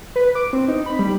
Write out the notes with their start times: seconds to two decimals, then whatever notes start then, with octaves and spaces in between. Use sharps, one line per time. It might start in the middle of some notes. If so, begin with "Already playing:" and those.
0.16 B4
0.35 D6
0.53 C4
0.68 D#4
0.86 B5
0.99 G3